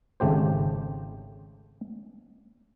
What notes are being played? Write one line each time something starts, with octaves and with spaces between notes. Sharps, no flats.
G#1 C#3 A3 G4 C5